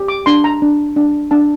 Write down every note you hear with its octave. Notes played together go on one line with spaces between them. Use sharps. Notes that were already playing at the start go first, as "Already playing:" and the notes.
Already playing: G4
D6
D4 C6
A#5
D4
D4
D4 A5